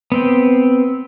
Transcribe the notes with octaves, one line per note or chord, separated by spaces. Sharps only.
B3 C4 G5